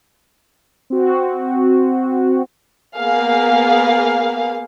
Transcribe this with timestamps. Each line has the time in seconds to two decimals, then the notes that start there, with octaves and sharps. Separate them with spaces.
0.90 C4 F#4
2.96 A#3 B3 G#4 F5